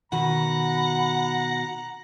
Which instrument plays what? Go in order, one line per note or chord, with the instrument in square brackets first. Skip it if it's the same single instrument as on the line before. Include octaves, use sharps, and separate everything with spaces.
[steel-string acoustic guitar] B2 D#3 F#4 [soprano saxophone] F#5 [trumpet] A#5 [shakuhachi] B5